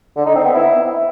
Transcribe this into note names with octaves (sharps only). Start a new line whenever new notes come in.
D3
D#4
C4
B3
E4